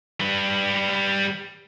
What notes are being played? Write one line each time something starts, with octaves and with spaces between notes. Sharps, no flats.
G3 B4